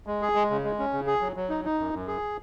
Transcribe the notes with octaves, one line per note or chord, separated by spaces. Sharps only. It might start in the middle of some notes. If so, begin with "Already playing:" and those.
G#3
G#4
G#3
C#3
G#3
C#4
C#3
G#4
F#3
F#3
D#4
D#4
F#2
F#2
G#4